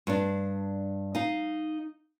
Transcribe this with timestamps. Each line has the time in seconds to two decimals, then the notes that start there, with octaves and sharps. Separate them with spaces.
0.07 G2 D4
1.15 D#4 F5